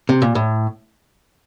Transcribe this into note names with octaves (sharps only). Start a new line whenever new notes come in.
C3
A#2
A2